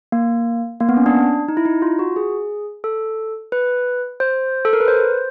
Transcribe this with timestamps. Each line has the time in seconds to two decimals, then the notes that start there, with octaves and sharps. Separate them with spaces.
0.12 A#3
0.80 A#3
0.89 B3
0.97 C#4
1.06 D4
1.48 D#4
1.57 E4
1.66 D#4
1.82 F4
1.99 F#4
2.16 G#4
2.84 A4
3.52 B4
4.20 C5
4.65 A4
4.73 A#4
4.80 B4
4.88 C5